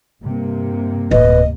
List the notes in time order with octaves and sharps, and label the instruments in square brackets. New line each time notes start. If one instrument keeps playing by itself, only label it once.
[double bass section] G2 C3 A#3
[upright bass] D1 [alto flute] B4 [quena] D#5